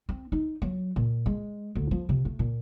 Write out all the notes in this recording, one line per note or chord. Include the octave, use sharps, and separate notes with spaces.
C4
D#4
F#3
A#2
G#3
D2
F3
C3
A3
A#2